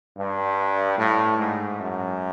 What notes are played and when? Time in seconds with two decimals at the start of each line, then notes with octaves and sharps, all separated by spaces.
0.17 G2
0.98 A2
1.38 G#2
1.79 F#2